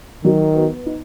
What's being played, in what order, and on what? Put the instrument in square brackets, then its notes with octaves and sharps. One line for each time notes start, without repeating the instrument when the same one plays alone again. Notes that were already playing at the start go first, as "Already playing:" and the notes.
[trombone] D#3 [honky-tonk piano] F#3
[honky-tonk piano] B3
D#4